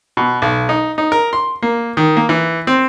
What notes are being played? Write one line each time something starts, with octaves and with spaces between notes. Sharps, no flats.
B2
B1
D#4
D#4
A#4
C6
A#3
D#3
A#3
E3
C4